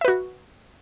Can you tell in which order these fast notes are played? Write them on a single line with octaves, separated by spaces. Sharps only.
E5 B4 F#4